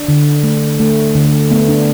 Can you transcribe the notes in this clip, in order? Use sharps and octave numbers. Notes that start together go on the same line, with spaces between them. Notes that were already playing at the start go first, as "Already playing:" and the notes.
Already playing: D4
D3
A3
A3
D3
A3 B3
D4